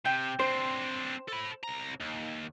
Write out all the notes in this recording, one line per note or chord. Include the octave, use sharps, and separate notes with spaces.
C3 G5
C4 D4 C5
A4 B5
C2 A#5
D#2